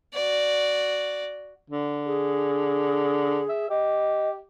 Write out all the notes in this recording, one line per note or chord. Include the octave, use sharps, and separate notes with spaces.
F#4 D5
D3
G#4
E5
G4 D#5